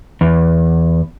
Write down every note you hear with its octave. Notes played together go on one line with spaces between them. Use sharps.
E2